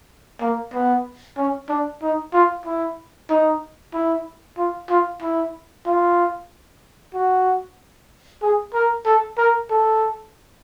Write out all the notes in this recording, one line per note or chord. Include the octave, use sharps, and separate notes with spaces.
A#3
B3
C#4
D4
D#4
F4
E4
D#4
E4
F4
F4
E4
F4
F#4
G#4
A#4
A4
A#4
A4